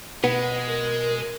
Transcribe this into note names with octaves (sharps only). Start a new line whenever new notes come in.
B2 G#3 B4 F#5
A#4